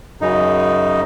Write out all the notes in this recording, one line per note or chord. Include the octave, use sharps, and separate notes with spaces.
F#2 C#3 D#4